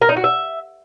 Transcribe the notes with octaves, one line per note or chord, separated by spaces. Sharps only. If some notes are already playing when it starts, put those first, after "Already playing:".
A#4
D#4
F#4
E5